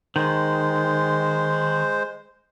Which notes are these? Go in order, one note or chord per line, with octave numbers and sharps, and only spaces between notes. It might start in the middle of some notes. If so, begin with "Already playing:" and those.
D#3 G#3 C5